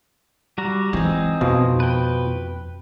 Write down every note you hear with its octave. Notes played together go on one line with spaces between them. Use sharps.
G3 F#4 A#5
E3 G#3 C4 D#4 G#4
F2 B2 F3 F4
B4 G5